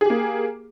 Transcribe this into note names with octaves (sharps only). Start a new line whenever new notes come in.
A#3 G4 G#4